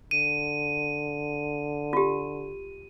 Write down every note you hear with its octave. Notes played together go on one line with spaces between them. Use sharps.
D3 D#7
F4 G4